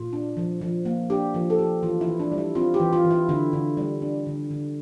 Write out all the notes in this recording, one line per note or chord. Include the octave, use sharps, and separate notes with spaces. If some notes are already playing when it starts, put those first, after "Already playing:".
Already playing: A#2 F4
D4
F3
F3
A#3
D4 G4
F3
A4
F3 G4
E3 F4
E4
E3
D4
G3
E4
C4 F4
G4
E3
F4
E3
E4
D3 E4
D3
G3
D4
D3
D3